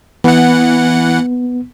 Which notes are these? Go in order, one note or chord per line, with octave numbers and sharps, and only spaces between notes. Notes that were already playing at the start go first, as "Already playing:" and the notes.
E3 B3 F#5